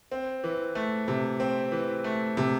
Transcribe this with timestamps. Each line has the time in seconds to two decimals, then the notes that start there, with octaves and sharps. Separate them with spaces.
0.11 C4
0.44 E3
0.75 A3
1.08 C3
1.40 C4
1.72 E3
2.04 A3
2.37 C3